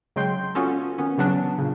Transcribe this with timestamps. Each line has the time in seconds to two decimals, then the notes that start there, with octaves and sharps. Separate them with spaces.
0.16 C#3 F#3 G#3 G5 C6 G6
0.55 B3 C#4 F4 F#4 A4
0.98 D#3 B3 C#4
1.18 C#3 E3 F#3 B3 C#4 D4
1.58 A#2 C#3